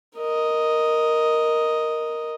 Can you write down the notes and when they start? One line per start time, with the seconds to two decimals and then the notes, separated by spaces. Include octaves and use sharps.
0.17 A#4 D#5